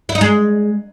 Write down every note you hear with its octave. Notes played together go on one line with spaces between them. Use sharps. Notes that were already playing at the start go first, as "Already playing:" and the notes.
E4
D#4
G#3